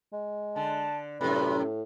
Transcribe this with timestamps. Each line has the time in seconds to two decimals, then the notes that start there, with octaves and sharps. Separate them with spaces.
0.13 G#3
0.56 D3 A5
1.21 F#2 A2 C3 B4